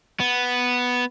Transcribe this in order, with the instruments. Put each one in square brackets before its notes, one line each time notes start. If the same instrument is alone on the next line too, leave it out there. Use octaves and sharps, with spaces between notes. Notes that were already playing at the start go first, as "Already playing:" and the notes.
[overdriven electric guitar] B3